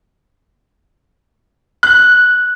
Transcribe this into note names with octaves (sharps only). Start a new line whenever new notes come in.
F#6